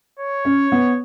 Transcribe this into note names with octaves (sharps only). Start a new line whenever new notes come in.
C#5
C#4
B3